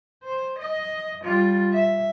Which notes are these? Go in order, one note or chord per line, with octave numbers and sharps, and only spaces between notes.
C5
D#5
G3 F4
E5